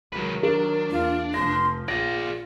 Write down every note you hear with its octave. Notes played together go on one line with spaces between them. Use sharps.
D#3 F#3 G#3 B4
D4 A#4
E2 A#3 F4
F1 F3 C6 A#6
A#1 F4 G#4 D5 A#6